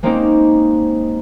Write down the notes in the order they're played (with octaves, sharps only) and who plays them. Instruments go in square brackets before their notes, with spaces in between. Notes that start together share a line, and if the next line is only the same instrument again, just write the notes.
[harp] G#3 A#3 C4 C#4 D#4 G4